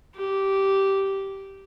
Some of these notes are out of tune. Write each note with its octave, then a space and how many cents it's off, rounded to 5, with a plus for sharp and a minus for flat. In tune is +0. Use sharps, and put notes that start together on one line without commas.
G4 -10